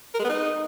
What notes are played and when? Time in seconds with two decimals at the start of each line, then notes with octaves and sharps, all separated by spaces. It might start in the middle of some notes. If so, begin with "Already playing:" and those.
0.14 A#4
0.19 G#3
0.24 B3
0.29 D#4